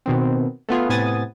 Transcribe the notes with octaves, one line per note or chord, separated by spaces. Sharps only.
B2 D#3 C4
A3 B3 F4 G#4
A2 C3 B3 G#5 D#6 A6